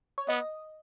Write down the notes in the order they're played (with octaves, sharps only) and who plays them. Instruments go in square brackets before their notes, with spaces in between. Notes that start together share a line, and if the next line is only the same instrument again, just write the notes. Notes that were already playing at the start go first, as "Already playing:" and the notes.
[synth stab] C#5
[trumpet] B3 [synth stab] D#5